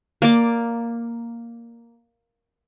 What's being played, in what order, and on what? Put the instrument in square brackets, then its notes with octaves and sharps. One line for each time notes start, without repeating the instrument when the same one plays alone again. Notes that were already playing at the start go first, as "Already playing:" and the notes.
[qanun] A#3 D5 D6